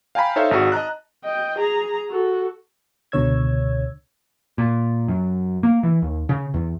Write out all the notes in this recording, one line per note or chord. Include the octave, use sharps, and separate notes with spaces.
F5 G5 G#5 A#5 B5
D#4 A4 C5 C#5 E5 F5
G#1 D#4 F#4 G#4
D#5 A5 A#5 F#6
D#5 G5
G#4 A#5
F#4 A4
C#2 B2 D3 C#5 E6 G#6
A#2
F#2
A#3
E3
D#2
C#3
E2